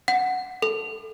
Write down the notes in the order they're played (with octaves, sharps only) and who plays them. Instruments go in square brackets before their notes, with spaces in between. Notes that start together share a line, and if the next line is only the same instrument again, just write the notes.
[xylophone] F#5
A4